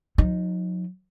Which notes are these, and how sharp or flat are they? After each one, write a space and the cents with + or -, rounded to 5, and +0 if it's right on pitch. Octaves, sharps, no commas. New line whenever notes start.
F#3 -45 D#4 +0